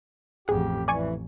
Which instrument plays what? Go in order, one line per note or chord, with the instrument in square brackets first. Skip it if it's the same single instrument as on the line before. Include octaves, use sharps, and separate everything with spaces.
[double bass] A1 F2 [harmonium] G4 [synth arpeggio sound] G#4 F#5
[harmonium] E3 [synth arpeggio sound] D5 G#5 C#6